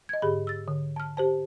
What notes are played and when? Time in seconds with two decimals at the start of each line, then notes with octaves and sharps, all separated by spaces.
0.09 D#5 G#6
0.22 G#2 D3 G4 G#4 B5
0.47 E6 A6
0.67 D3
0.96 A5 F6
1.17 G4 C5 A5